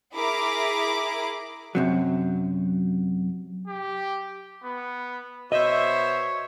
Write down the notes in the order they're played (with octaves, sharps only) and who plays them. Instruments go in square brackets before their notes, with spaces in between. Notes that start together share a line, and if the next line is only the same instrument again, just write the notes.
[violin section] E4 G#4 A#4 D6
[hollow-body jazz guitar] F#2 C3 F#3
[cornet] G4
B3
[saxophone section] B2 C5 E5 [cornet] C#5 [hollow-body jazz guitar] D#5